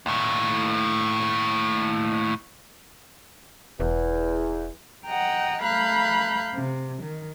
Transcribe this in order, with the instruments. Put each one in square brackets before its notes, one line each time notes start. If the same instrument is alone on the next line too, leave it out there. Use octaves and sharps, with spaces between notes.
[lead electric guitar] D#2 A2
[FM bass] E1 [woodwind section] E2
[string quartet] D#5 F#5 G5 A#5
A3 F5 A#5 B5 F#6 G6
C3
D#3